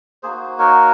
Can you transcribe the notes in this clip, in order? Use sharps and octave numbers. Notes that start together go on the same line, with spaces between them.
A#3 D#4 F#4 G#4 C5
A#4 C#5